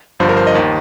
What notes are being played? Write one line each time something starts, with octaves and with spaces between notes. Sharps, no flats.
G1 G2 F3 C5
A#4
C5
D#5
D#2 D#3